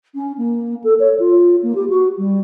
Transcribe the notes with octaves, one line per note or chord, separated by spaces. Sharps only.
C#4
A#3
A4
C#5
F4
A#3
G4
F#4
G3